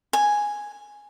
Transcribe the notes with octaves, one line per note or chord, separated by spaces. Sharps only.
G#5